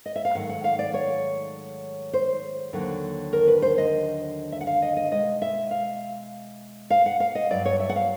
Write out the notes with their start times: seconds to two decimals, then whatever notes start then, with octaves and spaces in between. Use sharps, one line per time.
0.06 D#5
0.16 E5
0.25 F5
0.35 G#2 D#3 F#3 A3 F#5
0.49 F#5
0.64 F5
0.79 D5
0.94 C#5
2.13 C5
2.73 D#2 D3 F#3
3.33 A#4
3.47 B4
3.62 C5
3.78 D#5
4.52 E5
4.61 F#5
4.67 F5
4.82 D#5
4.97 D#5
5.11 B2 G#3 D#5
5.42 E5
5.71 F5
6.90 F5
7.06 F#5
7.20 F5
7.35 D#5
7.50 G2 D#3 F#3 D5
7.65 C#5
7.80 E5
7.89 F#5
7.96 F5